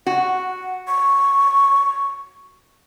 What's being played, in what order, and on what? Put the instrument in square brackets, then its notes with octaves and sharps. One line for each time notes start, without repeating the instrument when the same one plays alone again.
[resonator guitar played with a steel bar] F#4 [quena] F#5
[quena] C#6